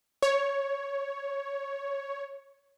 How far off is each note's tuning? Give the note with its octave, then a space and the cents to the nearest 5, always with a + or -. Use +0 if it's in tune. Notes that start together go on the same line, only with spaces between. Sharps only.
C#5 +5